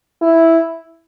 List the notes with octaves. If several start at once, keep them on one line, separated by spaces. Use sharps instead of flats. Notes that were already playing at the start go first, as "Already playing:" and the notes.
E4